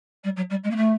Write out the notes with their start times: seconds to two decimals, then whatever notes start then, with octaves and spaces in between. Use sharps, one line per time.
0.24 G3
0.36 F#3
0.50 G3
0.64 G#3
0.70 A#3
0.76 A3